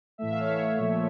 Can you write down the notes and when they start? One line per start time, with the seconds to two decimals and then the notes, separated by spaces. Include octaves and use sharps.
0.18 A2 E3 A3 E5
0.30 F5
0.40 C#5 E5
0.78 A#2 F3 A3